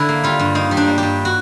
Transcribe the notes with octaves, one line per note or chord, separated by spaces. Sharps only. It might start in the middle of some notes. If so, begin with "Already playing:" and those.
Already playing: D3 E4
A#3
G3 F4
G2
A#3 D#4
G3
D4
A#3
G4
G2
F#4